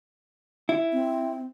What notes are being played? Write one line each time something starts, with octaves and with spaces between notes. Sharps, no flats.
E4
C4